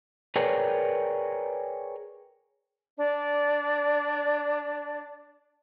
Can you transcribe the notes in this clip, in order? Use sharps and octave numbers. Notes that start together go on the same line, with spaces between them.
G#4 A#4 B4 C#5 D5 G5
D4 D5